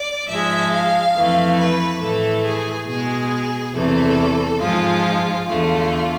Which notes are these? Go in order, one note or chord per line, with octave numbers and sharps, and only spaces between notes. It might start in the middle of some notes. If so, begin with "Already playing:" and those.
Already playing: D5
G#2 F3 G#3 E5
F5
F2 E3 A3
B4
A2 E3 A3 A4
G#4
B2 G#3 G#4
E2 C3 E3 A3 A4
G#2 F3 G#3 F4
E2 D3 A3 F4